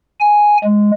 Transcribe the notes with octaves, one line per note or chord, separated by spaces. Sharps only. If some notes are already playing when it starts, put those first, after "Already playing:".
G#5
G#3